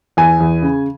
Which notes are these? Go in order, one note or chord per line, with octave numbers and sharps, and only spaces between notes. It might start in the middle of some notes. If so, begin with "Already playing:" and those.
E2 G#5
E2
C#3